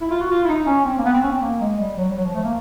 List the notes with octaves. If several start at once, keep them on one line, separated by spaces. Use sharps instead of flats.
E4
F4
F#4
F4
E4
D#4
C#4
C4
A#3
B3
C4
C#4
C4
A#3
G#3
G3
F#3
G3
F#3
F3
A3
A#3